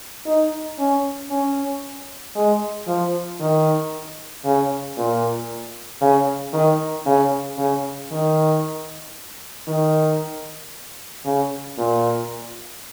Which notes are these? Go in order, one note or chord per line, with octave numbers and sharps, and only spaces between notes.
D#4
C#4
C#4
G#3
F3
D#3
C#3
A#2
C#3
D#3
C#3
C#3
D#3
D#3
C#3
A#2